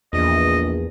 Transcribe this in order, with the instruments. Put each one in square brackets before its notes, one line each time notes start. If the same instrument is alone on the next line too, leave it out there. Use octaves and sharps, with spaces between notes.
[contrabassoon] A#1 [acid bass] E2 [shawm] D#5